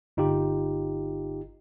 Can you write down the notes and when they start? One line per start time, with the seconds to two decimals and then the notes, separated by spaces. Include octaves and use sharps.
0.17 G1 D#4 F4 G4